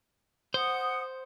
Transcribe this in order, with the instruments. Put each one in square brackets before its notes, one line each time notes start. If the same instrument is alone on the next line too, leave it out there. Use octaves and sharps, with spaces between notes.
[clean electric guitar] C5 [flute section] F#5 D#6